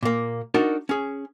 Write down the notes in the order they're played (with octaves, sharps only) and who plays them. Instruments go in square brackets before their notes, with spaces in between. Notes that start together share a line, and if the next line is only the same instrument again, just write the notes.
[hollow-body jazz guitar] A#2 A#3
D4 D#4 F#4 A#4 A5
C#4 G#4